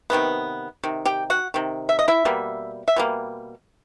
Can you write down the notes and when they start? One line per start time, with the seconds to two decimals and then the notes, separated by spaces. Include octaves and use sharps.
0.10 C3 D#3 G#3 B3
0.83 C3 D#3
1.05 G4 G5
1.30 F#4 F#5
1.54 C3 D#3
1.89 E5
1.99 D#5
2.08 E4 E5
2.25 B2 G3 A#3
2.88 E5
2.96 B2 G3 A#3